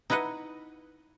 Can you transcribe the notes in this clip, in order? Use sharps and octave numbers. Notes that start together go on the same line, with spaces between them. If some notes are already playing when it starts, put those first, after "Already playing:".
D#4 E4 B4 D#5 F#5